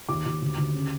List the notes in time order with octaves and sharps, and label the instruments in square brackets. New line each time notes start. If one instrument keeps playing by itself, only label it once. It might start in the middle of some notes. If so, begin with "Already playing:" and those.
[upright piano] D#2 D6
D#2
D2
D2
C#3